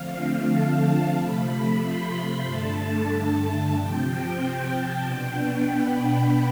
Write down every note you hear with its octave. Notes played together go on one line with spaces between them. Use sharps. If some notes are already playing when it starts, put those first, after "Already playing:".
Already playing: D3 F3 A3 C4 F5
F5
A5
C3 F3 A3 B5
C6
B5
G2 D3 A3 A5
C3 F3 C4 G5
G5
A5
B2 B3 D4 G5
B5